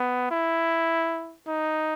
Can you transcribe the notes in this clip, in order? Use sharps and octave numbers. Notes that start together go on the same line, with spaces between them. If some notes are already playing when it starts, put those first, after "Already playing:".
Already playing: B3
E4
D#4